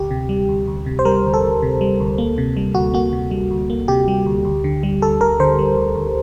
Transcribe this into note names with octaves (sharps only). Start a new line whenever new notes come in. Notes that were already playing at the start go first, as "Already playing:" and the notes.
Already playing: D2 G4
C3
G3
D2
D2
C3
C5
G3 A#4
D2
A4
D2
C3
G3
D2
A#3
C3
G3
D2 F#4
A#3 F#4
C3
G3
D2
A#3
C3 G4
G3
D2
D2
D3
G3
D2 A4
D2 A#4
D3 C5
G3
D2
D2